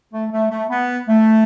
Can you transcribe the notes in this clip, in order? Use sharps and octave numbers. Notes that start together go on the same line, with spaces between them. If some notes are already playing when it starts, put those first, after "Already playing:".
A3
A3
A3
B3
A3